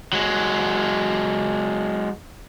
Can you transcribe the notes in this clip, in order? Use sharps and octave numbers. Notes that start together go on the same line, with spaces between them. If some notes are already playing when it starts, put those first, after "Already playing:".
F#3 G#3